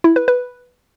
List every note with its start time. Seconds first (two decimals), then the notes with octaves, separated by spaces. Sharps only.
0.04 E4
0.16 B4
0.28 B4